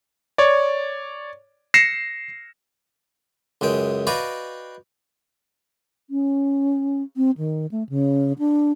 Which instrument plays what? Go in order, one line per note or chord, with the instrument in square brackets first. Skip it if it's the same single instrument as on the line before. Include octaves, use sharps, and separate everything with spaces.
[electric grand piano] C#5 D5
A#6 C7 C#7 E7
[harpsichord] C#2 F#2 G#3 G5
F#4 B4 D5 D#5 F5 G5
[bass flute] C#4
C4
D#3
A3
C#3
D4